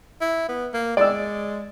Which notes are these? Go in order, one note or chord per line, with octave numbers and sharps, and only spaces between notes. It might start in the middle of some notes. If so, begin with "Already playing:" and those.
E4
B3
A#3
G#3 D5 E6